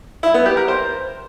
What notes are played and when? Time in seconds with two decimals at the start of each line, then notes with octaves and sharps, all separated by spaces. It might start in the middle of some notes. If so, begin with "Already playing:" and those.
0.23 E4
0.34 B3
0.46 G4
0.57 A#4
0.68 C5